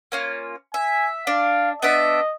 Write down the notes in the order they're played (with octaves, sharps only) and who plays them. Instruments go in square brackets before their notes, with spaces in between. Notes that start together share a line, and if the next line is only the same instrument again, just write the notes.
[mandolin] A#3 C#4 F4
[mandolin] E5 [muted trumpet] G#5
[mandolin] D4 [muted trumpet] F5
[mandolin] B3 D4 E5 [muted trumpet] D#5